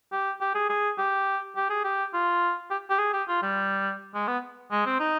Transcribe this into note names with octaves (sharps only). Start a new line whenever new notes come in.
G4
G4
G#4
G#4
G4
G4
G#4
G4
F4
G4
G4
G#4
G4
F4
G3
G#3
B3
G#3
C4
D#4